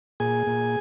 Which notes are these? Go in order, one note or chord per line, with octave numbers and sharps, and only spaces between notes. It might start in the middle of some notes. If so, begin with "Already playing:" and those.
A#2 G#4 G#5
A#2